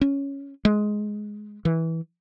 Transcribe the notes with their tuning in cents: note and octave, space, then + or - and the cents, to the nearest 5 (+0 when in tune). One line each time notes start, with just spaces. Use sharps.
C#4 +5
G#3 +10
E3 -15